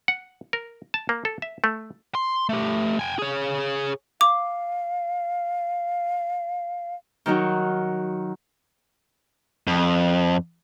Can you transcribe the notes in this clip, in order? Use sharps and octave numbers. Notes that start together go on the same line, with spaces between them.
F#5
A#4
A5
A#3
A4
E5
A3
C6
A3 G4
G5 G#5
G#4 C#5
F5 D6
D#3 F#3 D#4 F#4
F2